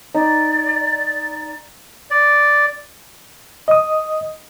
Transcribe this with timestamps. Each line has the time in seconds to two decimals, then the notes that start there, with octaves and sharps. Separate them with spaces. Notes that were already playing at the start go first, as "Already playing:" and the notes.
0.14 D#4 D5
2.11 D5
3.68 D#5 D#6